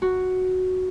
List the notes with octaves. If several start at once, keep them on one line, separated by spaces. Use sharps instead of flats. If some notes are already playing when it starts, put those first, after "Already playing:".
F#4